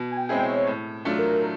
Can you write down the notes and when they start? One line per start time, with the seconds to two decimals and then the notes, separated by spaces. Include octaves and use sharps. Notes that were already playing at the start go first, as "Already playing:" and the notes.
Already playing: B2
0.11 G#5
0.17 G5
0.29 G#3 C4 E4 G#4
0.42 C#5
0.67 A2
1.05 F#3 A3 D4 F4
1.19 A#4